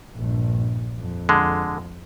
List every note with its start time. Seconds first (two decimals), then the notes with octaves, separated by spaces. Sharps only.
0.15 A#1 G2
0.97 F2
1.29 D3 G#3